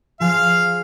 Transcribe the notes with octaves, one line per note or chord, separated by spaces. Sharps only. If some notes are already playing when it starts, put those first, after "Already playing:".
F3 G#4 C5 F5